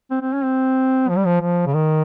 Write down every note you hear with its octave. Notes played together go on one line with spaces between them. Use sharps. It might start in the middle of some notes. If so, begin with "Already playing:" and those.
C4
C4
C#4
C4
F3
G3
F3
F3
C#3
D#3